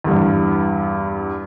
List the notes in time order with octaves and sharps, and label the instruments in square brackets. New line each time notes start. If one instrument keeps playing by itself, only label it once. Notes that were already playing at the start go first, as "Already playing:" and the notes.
[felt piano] E2 G2